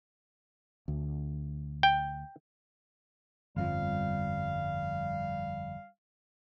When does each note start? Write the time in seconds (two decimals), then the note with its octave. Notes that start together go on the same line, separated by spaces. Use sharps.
0.88 D2
1.83 G5
3.56 G1 F2 F3 G3 F5